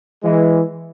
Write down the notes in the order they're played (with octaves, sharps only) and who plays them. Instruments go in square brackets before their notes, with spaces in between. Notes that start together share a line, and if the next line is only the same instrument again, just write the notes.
[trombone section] E3 G#3